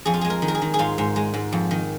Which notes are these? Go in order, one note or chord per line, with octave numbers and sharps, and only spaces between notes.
F2 G#4
F4
G#3 G#4
A#4
D#3
A#4
G#4
D#3
G#4
G#2 F4
G#2
G#3
G#2
F2
D#3